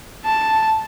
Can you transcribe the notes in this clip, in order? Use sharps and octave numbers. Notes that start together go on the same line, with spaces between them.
A5